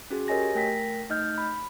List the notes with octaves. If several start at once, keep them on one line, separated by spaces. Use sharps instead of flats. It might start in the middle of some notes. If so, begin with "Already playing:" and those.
C#4 F#4 G#4
G4 A#4 C#5 D#5 G#5 A#6
A3 A#4 G5 A#6 B6
A3 D#4 D#5 F6 G6
B5